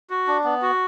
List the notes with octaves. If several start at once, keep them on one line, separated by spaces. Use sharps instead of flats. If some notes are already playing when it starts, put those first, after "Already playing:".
F#4
D4
B3
F#4